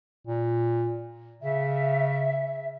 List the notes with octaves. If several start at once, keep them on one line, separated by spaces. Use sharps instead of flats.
A#2
C#3 E5